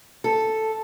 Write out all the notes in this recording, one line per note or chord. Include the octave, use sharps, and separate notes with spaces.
A4